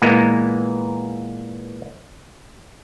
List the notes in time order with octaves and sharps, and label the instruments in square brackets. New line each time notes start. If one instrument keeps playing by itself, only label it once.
[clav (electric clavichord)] A#2 E3 G#3 A#3 B3